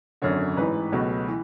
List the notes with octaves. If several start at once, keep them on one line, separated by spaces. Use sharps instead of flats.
G#1 F#2 D3 C#5
A1 G#2 E3 B4
C#2 B2 F#3 A3 C#4
E3